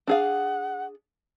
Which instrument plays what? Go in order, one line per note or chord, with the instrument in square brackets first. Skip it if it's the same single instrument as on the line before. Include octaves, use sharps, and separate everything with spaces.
[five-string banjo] D4 G#4 F5 [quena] F#5